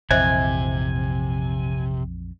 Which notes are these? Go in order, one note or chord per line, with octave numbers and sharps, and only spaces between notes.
A#1 F2 C3 E3 C5 D#5 E5 G#5